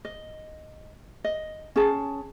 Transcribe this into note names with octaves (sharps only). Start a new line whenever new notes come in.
D#5
D#5
C#4 G#4 A5